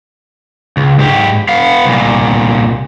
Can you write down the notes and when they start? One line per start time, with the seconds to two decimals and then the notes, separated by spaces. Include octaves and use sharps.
0.77 C#2
0.99 G#2 G4
1.48 B3 F5
1.86 C2 A#2